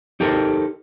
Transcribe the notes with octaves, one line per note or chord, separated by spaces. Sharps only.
D#4 G4 A4 A#4 C5